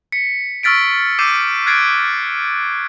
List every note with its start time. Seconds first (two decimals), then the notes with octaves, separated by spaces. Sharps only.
0.12 B6 C#7
0.63 C#6 E6 F6 A6 B6 D7
1.19 D6 E6 G6 A6 C7 D#7
1.66 F6 F#6 G#6 A6 C7 D7